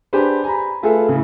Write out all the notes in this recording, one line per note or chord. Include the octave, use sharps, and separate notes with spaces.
D4 G4 G#4 B4 C5
G#5 A#5 B5
A3 F4 G#4 A4 B4 E5
A2 C#3